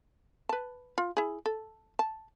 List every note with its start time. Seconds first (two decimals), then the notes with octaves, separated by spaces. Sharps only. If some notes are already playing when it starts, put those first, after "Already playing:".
0.49 B4 A5
0.98 F4
1.17 E4 G#4
1.46 A4
1.99 A5